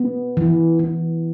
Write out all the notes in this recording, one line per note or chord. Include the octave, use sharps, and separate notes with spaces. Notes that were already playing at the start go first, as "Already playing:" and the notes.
Already playing: B3
E3
E3